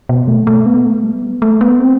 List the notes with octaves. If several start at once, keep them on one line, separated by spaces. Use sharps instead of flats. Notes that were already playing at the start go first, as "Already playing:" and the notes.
B2
A3
A3
B3
A3
G3
B3
A3
B3
C4